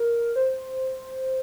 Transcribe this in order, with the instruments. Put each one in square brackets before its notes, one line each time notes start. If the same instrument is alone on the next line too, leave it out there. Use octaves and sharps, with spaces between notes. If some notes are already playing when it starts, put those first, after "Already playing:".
Already playing: [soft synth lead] A#4
C5